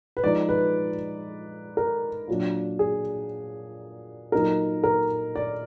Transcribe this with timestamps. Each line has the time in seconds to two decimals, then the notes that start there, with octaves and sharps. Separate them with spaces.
0.17 B4
0.23 F3 G#3 D#4 D5
0.49 B4
1.77 A#4
2.28 A#2 F#3 D4
2.79 G#4
4.32 A#2 F#3 A#3 D#4 A#4
4.84 A#4
5.36 D5